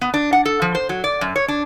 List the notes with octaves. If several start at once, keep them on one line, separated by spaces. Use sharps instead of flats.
B3
D4
F#5
A4
F3
C5
F#3
D5
F#2
C#5
D4